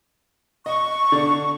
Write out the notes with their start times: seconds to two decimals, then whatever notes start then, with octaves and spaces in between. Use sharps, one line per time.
0.66 D#5 C#6
1.12 D3 D5